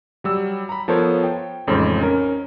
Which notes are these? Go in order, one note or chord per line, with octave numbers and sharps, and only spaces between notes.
F#3 G3 E6
A#5 B5
F3 B3 A4 A#4 C5 C#5
G5
A1 F2 C#3 G#3 D#4 C5
C#4 A#4